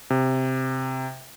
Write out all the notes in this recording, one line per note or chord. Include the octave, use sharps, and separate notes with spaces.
C3